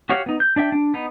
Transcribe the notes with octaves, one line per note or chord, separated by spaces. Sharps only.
F#4 G4 C#5 F5 F#5
B3 D#4
G6
D4 D5 E5 G5
D4
B3 D#4